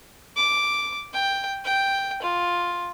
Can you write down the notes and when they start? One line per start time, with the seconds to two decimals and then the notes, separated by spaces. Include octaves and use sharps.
0.36 D6
1.14 G5
1.65 G5
2.22 F4